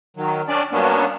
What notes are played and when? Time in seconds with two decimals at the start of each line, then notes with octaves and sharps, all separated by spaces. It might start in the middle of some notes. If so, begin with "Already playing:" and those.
0.17 D#3 F#3
0.48 C#4 D4 D5
0.72 G2 F#3 A#3 B3 C#4 D4